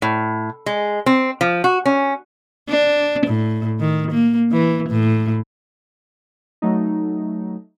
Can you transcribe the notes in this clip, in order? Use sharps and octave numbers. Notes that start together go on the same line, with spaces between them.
A2
G#3
C4
F3
F#4
C#4
D4
A2
D#3
A#3
E3
A2
F#3 A3 D#4